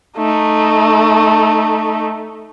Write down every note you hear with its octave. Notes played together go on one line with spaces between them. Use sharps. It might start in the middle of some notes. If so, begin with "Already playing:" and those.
A3 D#4